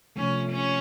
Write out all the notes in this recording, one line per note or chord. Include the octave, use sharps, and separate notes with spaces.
C3 F3 A3 C#4
C#4